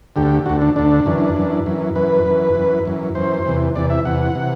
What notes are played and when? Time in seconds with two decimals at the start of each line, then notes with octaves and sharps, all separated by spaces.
0.16 D2 D3 G4
0.46 D2 D3 F#4
0.62 D4
0.76 D2 D3 D4
1.06 F#2 E3
1.36 F#2 E3
1.66 F#2 E3
1.95 F#2 E3 B4
2.25 F#2 E3
2.55 F#2 E3
2.85 F#2 E3
3.15 F#2 E3 C5
3.46 E2 C3 E3
3.75 E2 C3 E3 D5
3.90 E5
4.05 E2 C3 E3 F#5
4.35 C3 E3